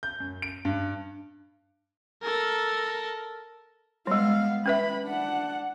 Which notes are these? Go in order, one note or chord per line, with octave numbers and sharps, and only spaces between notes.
G6
F#2
D7
G2
A4 A#4
G3 G#3 B3 F5
C#4 B4 E5 B5
D4 F#5